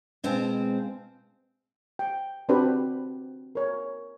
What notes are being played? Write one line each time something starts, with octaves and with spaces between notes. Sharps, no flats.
B2 G#3 C4 F4 C5 A5
G5
C4 D4 F#4 G4 B4 C5
A#4 C#5